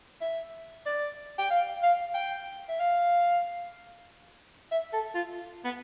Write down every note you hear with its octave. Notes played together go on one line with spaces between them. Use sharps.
E5
D5
G5
F5
F5
G5
E5
F5
E5
A4
F4
B3